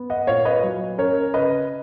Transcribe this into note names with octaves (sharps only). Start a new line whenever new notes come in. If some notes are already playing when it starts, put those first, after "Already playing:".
Already playing: B3
D#5 F#5
A#2 C#5 F5
B4 D#5
F#3
C#4 A#4 C#5
C#3 B4 D#5